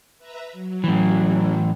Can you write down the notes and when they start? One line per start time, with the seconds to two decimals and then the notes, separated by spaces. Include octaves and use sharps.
0.18 B4 E5 A#5
0.52 F#3
0.84 A2 E3